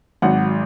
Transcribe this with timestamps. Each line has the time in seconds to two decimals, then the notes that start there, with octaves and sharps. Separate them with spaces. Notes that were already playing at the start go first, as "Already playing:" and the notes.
0.22 G#1 G#2 F#3 F#5